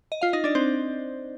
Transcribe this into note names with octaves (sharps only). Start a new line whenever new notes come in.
D#5
F4 F5
D#4 D#5
D4 D5
C4 C5